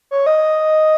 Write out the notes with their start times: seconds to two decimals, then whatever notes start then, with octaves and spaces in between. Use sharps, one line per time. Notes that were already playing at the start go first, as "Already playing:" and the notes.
0.11 C#5
0.26 D#5